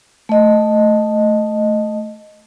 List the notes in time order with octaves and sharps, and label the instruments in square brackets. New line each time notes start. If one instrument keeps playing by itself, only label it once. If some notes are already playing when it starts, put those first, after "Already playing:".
[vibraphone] A3 D#5